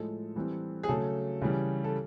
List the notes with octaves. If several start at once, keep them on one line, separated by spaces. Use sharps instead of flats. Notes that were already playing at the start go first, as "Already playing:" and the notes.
Already playing: A2 F3 G#3 A4
E3 G3 C4
G#4
C#3 F#3 A3 A4
C#3 E3 G3
A4